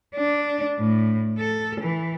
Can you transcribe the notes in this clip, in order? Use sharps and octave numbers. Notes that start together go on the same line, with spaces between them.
D4
A2
A4
E3